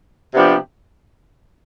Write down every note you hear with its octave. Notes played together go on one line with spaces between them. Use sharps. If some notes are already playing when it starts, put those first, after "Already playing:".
C3 F3 B3 D4 G4